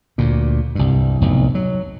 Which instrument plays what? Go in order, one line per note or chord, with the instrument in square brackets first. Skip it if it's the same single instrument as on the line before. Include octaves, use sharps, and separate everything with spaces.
[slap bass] D2 A#2
C2 G2
F1 B1 A2
F#3